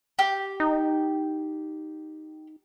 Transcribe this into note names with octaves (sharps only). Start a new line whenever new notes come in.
G4
D#4